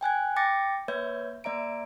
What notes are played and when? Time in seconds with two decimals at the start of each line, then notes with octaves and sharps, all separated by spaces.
0.01 G5 G#5 F#6 G#6
0.36 G5 D6 A6 A#6 C#7
0.88 A#3 B4 C#5 E5 G6 G#6
1.44 A#3 D5 E5 A#5 D7